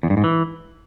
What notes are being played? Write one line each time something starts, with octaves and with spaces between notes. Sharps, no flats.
E2
G2
G#2
E3